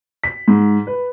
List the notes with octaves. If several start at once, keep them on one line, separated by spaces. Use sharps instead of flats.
B6
G#2
B4